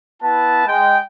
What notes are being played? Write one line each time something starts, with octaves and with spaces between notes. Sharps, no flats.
B3 E4 B4 A5
G#3 G5